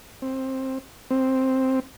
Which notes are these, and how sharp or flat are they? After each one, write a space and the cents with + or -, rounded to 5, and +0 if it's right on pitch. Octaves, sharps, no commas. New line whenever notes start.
C4 +15
C4 +5